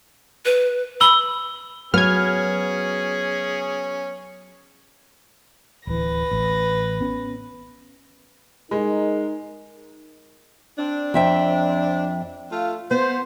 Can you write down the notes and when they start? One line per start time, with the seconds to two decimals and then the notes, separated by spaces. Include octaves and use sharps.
0.45 B4
1.01 B5 E6 G7
1.94 F#3 B3 C#4 G#4 F6 G#6
5.87 D1 E3 B4 A#6
6.31 A1
7.01 B3 C#4
8.71 G#3 D#4 A#4
10.79 C4 D4
11.14 F2 E5 G5
12.52 A3 F4
12.91 B3 C5